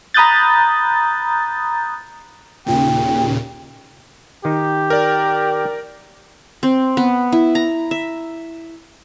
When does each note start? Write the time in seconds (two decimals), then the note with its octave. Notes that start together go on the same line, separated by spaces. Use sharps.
0.14 A#5 B5 D#6 F#6 G6 A6
2.66 D#2 A#2 C#3 G5
4.45 D#3 D#4 G4
4.90 A#4 D5
6.63 C4
6.97 B3
7.32 E4
7.55 A#5
7.91 E5